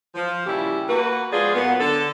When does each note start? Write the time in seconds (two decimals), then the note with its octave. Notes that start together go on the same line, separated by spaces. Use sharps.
0.15 F3
0.46 A#2 C#3 G3 E4 G4
0.89 A#3 F#4 B4
1.33 F3 G#3 B3 F4 G#4 D5
1.55 G#2 F#3 A#3 B3
1.80 D3 A4